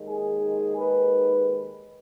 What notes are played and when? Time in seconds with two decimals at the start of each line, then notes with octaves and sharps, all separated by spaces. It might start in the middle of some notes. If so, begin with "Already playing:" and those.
Already playing: D#2 D#3 G#3
0.09 G#4
0.78 B4